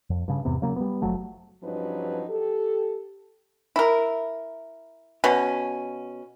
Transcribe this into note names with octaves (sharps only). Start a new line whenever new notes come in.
F2
G2 C#3
E2 G#2 C3 B3
C#3 F#3 A#3
G3 B3
F#1 F3 F#3 A3
G2 F3 F#3 C#4 D#4 B4
G4 A4
E4 A#4
B2 C#4